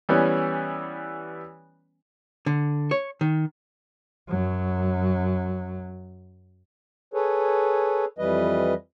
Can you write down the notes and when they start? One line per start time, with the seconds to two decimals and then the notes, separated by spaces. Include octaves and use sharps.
0.09 E3 G3 B3 C#4
2.46 D3
2.91 C#5
3.21 D#3
4.29 F#2 F#3
7.14 G#4 A4 B4 C#5
8.18 F2 E3 G3 B4 D#5